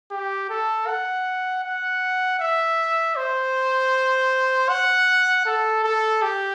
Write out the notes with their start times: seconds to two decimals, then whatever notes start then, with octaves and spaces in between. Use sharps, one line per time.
0.11 G4
0.50 A4
0.87 F#5
1.64 F#5
2.40 E5
3.16 C5
4.69 F#5
5.46 A4
5.84 A4
6.22 G4